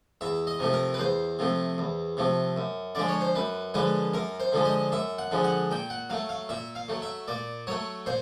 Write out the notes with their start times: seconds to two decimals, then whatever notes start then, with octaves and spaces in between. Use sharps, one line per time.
0.21 E2 E5
0.47 D#5
0.59 C3 F3 A3
0.73 A#4
0.94 B4
0.99 E2 C5
1.39 C3 F3 A3
1.78 E2
2.17 C3 F3 A3
2.57 F#2
2.95 D3 F3 G#3 D5
3.08 C#5
3.21 C5
3.35 F#2 B4
3.74 D3 F3 G#3 B4
4.14 F#2 A#4
4.40 C5
4.53 D3 F3 G#3
4.65 D#5
4.92 F#2 E5
5.18 F#5
5.31 D3 F3 G#3
5.44 F#5
5.71 A#2 G5
5.90 F#5
6.10 F#3 A3 F5
6.29 F5
6.49 A#2 E5
6.75 F5
6.88 F#3 A3
7.02 E5
7.28 A#2 D5
7.67 F#3 A3 C#5
8.06 A#2 C5